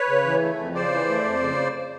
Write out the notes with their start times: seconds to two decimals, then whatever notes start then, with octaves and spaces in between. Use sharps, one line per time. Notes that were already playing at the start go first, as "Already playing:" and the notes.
Already playing: B4 C#5
0.08 C#3
0.25 E3
0.42 A3
0.59 F2
0.75 C#3 C5 D5
0.92 E3
1.09 A3
1.25 F2
1.41 C#3